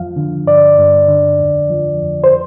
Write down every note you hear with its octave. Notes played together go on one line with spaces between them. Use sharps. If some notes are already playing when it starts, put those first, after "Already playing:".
Already playing: F2 F3 F5
D3
G2 D5
G2
D3
F2
F3
F2
C5